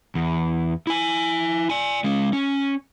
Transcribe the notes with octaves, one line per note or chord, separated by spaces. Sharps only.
E2
E4 G#5
D5 G#5
G#3 C#4
C#4